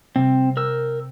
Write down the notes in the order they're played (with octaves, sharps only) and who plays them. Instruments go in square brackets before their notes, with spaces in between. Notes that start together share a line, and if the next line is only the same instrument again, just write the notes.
[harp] C3 G3 [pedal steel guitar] C4
[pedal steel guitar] A#4 E6 [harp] G5 F#6